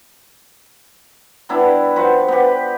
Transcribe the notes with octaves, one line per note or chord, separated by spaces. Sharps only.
G3 B3 D4 E4
F3 F#4 B4 C5
B3 G4